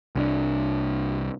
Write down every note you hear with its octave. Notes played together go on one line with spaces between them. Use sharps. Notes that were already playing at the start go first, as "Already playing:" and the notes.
C2 C#4 D4